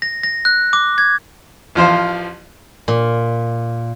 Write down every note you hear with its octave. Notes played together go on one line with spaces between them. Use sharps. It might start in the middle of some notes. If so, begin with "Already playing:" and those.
A#6
A#6
F#6
D6
G#6
A1 F3 C5 F5
A#2